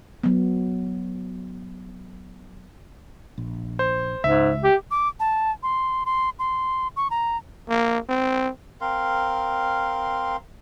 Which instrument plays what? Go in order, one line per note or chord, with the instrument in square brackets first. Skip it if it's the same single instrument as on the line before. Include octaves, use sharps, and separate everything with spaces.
[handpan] F#3 B3
[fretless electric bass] A#1
[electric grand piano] C5
[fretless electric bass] C#2 [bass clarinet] G#2 [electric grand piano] E5
[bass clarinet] G4
[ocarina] D6
A5
C6
C6
C6
C#6
A#5
[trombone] A#3
C4
[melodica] C4 A#4 F5 C6